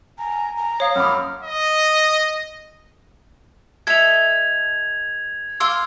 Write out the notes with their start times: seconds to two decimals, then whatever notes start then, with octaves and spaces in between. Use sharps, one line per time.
0.18 G#5 A#5
0.57 A#5
0.80 C#5 F5 D#6
0.95 F#2 B5 D6 F6
1.44 D#5
3.87 A4 D#5 E5 G#6 F7
5.60 F5 C6 D6 E6